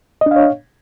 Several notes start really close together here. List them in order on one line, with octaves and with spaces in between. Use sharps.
D#5 D4 F5 C#5